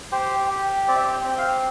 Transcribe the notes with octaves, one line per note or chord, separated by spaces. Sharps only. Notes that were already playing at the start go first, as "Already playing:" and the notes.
G4 C5
G4
C4 D5
E5
D5
G5
C4 G5
F5